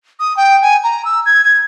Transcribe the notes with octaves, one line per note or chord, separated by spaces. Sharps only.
D#6
G5
G#5
A#5
E6
G#6
G#6